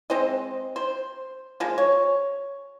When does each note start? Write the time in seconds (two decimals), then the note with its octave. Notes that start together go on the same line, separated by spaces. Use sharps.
0.10 G#3 C4 C5 D#5
0.76 C5
1.60 F3 G#3 A#3
1.78 C#5